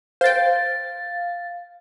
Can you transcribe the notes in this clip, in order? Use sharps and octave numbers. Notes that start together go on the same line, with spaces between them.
C5 F5 G5 A6